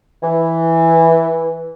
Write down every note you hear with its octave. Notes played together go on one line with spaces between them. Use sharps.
E3